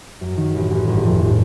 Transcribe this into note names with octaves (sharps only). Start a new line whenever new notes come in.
F#2
D#3
A1
A1
G1
F2
A2